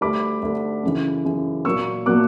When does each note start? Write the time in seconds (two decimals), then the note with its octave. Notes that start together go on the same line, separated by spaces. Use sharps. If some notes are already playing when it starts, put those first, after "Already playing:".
0.01 D2 D3 G3 B5 D6
0.42 D2 D3 G3
0.83 F#2 C#3 E3
1.25 F#2 C#3 E3
1.65 A#2 F#3 A#3 C#6 E6
2.06 A#2 F#3 A#3 D6 F#6